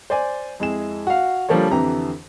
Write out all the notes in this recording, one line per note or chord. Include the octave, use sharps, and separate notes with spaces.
C5 D5 G#5
F2 G#3 E4 G#4 E7
F#4 F5
D3 F3 G3 A#3 A4 C#5
F2 D3 E3 G4 A#5